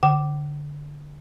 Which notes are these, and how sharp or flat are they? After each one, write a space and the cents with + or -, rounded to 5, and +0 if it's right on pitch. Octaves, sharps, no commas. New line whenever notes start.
D3 -5 G5 -45 D6 +0